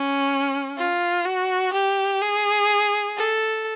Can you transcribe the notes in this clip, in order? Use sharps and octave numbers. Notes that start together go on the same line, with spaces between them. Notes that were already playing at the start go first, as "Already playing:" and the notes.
Already playing: C#4
F4
F#4
G4
G#4
A4